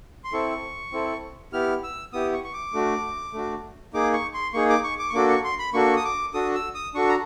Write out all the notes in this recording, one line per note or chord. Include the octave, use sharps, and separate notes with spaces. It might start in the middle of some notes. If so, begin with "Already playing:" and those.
C6
C4 E4 A4 C#6
C4 E4 A4
B3 E4 G4 F6
E6
B3 E4 G4 D#6
C#6
C#6
D6
A3 D4 F#4
A3 D4 F#4
A#3 D#4 G#4 D6
C#6
C6
A#3 D#4 G#4 C#6
D6
C#6
D6
C#6
A#3 D4 F#4 A4 D6
C#6
C6
B5
A#3 D4 F#4 A4 C#6
D#6
D6
D4 F#4 A4 D#6
E6
D#6
D4 F#4 A4 C#6
A#5